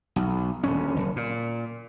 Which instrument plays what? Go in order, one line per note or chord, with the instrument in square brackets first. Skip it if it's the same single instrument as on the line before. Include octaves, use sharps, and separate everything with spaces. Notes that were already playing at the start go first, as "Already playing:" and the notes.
[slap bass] B1
D#1 D2 C#4
F#1
A#2